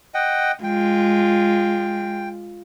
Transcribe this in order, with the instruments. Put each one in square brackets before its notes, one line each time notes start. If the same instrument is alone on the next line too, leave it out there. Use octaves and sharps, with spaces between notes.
[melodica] D#5 F#5 G5
[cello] G#3 [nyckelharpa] F4 [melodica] G5